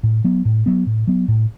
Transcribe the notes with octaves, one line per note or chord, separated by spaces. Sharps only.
A2
F#3 B3
A2
F#3 B3
A2
F#3 B3
A2